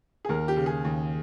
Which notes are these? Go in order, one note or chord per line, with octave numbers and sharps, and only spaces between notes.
G#4
D#2 A#4
G4
C#3
G#4
D#2